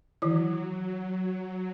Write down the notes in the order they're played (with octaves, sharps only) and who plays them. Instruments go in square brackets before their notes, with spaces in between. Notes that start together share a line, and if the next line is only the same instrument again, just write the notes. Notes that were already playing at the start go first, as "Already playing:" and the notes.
[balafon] D#3 E3 E4 [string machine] F#3